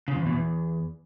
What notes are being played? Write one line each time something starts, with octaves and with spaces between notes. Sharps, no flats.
C#3
F2
E2
B2
E2